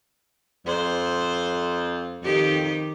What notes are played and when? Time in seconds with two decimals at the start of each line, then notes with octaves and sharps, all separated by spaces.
0.67 F2 C5
2.24 F2 D#3 D#4 G4